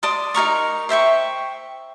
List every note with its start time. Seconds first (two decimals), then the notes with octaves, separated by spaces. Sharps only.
0.03 D5 A5 C6 D#6
0.34 D#4 G#4 A#4 C#6
0.89 C5 E5 G5 C#6